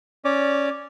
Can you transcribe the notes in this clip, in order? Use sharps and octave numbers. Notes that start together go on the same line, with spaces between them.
C#4 D5